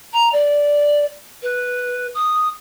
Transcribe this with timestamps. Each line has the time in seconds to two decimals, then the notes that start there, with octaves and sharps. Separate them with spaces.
0.13 A#5
0.32 D5
1.42 B4
2.14 D#6